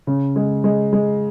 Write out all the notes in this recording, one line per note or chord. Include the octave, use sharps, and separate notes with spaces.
C#3
G#3
G#3
G#3